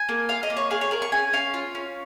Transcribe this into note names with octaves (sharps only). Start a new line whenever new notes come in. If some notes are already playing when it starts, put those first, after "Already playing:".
Already playing: G#5
A#3
F4 F5
D#5
A#3
C#5
G#4 F5
C#5
G#4 A#4
C#6
C#4 G#5
C#4 F5
F4
C#4